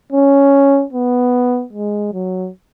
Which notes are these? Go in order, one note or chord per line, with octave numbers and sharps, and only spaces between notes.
C#4
B3
G#3
F#3